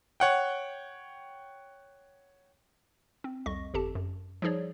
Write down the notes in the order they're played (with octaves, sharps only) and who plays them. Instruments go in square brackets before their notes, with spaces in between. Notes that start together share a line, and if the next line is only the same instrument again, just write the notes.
[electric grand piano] C#5 F#5 G5
[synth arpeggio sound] C4
C2 F2 D#5 C#6 A#6
G1 F2 G4 A4 A5
F#2
F3 G3 D#4 G#4 C#5 D5